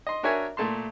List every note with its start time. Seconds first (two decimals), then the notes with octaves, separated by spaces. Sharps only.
0.07 D#5 C6
0.23 D4 F#4 A#4 C#5 E5 G#5
0.57 A#2 A3 A5 C6